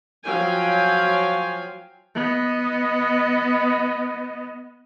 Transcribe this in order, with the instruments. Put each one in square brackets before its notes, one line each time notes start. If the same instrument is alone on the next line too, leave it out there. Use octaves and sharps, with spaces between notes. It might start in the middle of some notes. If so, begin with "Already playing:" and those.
[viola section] F3 F#3 F5 G5 G#5
[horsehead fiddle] B3 D#5